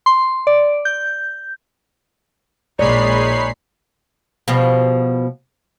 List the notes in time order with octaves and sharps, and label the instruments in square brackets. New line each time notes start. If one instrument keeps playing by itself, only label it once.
[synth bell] C6
D5
G6
[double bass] A#1 [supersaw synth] G#3 B5 C7 [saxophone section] D#4 C#5 [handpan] D5
[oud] B2 F3 G3